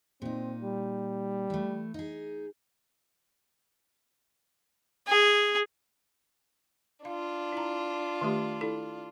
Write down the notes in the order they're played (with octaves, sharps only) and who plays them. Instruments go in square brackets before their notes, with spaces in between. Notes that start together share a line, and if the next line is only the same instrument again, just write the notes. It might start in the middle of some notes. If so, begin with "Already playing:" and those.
[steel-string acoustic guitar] A#2 D#4 [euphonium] C4
[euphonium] G3
[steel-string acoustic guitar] E3 A3
D#4 G#4
[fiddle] G#4
[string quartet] D4 F4 [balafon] F5
[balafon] E4 A#5
D#3 A3 G4
E4 A4